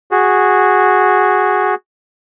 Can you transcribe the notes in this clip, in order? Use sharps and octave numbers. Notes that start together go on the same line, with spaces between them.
F#4 G#4